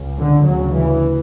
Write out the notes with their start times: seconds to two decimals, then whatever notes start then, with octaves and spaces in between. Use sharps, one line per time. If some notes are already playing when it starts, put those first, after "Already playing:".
Already playing: C#2 C#3
0.18 D3
0.46 D2 C#3 F#3
0.74 E3